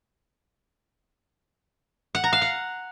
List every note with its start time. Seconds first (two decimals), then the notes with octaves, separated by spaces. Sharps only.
2.15 F#5
2.24 A#5
2.33 F5
2.42 F#5